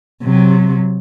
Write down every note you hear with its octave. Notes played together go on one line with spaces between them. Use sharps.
C3 F#3